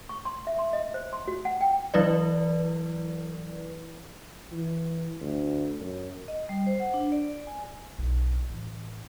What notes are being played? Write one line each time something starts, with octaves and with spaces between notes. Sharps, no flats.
C#6
C6
E5
C6
D#5
C5
C6
F#4
F#5
G5
E3 F#3 E4 B4 D5
E3
D2
F#2
D#5
G3
C5
F#5
D4
D5
G#5
B1
A1 C#4